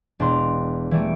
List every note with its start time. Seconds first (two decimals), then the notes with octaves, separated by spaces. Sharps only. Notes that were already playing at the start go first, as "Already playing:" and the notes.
0.20 E1 D4 A#5 C6
0.91 E3 G3 A3 D7